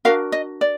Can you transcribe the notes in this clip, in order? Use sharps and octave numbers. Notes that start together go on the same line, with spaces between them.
D4 F#4 A#4 F5
D#5
D5